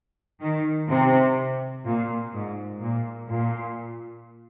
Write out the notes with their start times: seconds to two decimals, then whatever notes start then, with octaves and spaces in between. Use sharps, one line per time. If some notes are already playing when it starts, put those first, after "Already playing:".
0.41 D#3
0.89 C3
1.85 A#2
2.33 G#2
2.80 A#2
3.28 A#2